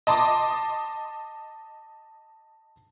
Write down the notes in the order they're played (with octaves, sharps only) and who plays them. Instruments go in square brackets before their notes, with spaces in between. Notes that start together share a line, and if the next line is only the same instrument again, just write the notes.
[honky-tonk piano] D#5 A5 C6 D6 D#6